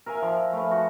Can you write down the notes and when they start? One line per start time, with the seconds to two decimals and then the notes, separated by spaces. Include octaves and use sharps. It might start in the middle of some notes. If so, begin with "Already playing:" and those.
0.06 A#4 E5 F5 G#5
0.22 F3
0.53 A3 B4
0.71 F#4